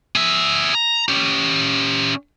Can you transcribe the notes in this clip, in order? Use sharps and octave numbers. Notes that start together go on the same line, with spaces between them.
G#4 E5
A#5
C#4 G4